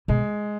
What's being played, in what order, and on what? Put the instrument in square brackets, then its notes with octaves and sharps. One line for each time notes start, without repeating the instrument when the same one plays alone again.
[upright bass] B2 [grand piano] G#3